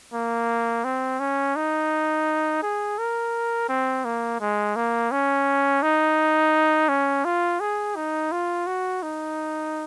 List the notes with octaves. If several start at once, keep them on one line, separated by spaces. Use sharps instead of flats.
A#3
C4
C#4
D#4
G#4
A#4
C4
A#3
G#3
A#3
C#4
D#4
C#4
F4
G#4
D#4
F4
F#4
D#4